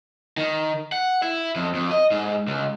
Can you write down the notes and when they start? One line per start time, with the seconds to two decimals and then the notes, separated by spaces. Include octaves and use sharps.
0.37 D#3
0.92 F#5
1.23 E4
1.56 F2
1.75 F2
1.91 D#5
2.11 G#2
2.47 C#2